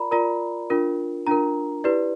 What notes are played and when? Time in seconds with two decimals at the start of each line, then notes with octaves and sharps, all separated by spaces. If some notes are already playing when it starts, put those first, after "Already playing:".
Already playing: F4 A#4 D5 A#5 B5
0.11 F4 A#4 D5 A#5
0.70 D4 F4 A#4
1.27 D4 F4 A#4 A#5
1.84 E4 G4 B4 D5